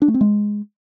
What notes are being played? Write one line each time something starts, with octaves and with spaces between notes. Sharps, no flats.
D4
A3
C4
G#3